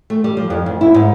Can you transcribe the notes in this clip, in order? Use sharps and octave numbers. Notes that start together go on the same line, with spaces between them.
A3
G3
F3
F2
D2
E4
G#2